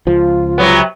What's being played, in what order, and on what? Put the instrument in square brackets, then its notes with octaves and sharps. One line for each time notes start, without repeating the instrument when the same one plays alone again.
[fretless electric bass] C#2 F3 [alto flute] F4
[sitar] C3 F#3 B3